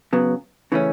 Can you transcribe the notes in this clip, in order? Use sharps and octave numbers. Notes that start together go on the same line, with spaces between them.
C#3 F#3 B3
C#3 E3 A3 C#4